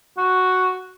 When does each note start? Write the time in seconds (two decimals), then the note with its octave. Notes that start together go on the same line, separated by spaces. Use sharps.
0.18 F#4